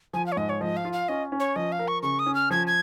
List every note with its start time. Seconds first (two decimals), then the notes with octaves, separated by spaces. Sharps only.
0.13 F3 G#5
0.26 F5
0.32 C#5
0.37 G#2 D#5
0.49 C#5
0.61 F3 D#5
0.77 F5
0.85 F4
0.93 F5
1.08 C#4 D#5
1.32 C#4
1.40 C#5
1.56 F3 D#5
1.72 F5
1.79 A#4
1.88 C#6
2.03 C#3 C#6
2.19 D#6
2.26 C#4
2.35 F6
2.50 F3 G#6
2.67 G#6